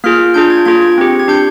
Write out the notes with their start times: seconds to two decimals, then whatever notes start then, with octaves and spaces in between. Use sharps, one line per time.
0.04 A#3 F4 G#4 F6
0.34 D4 F4 G#4 G6
0.50 G#6
0.66 A#3 F4 G#4 G#6
0.82 G#6
0.98 C4 G4
1.20 G#6
1.28 D4 G4 G6